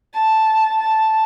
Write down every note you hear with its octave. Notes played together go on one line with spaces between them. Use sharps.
A5
A5